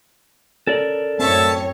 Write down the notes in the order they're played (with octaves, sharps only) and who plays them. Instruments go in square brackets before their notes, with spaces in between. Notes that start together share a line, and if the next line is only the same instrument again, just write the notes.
[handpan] C#4 [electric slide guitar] A4 A#4 D5
[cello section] F#2 A2 C#5 [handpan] C4 [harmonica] E5 A5